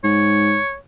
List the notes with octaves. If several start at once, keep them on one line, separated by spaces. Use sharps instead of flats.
G#2 C#5